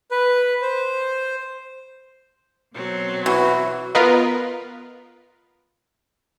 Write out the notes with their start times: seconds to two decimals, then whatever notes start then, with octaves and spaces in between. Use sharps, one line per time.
0.11 B4
0.62 C5
2.74 B2 F#3 C4
3.26 E3 F#4
3.95 B3 F4 A#4 B4 D#5